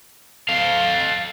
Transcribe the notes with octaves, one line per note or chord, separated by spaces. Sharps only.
A4 F5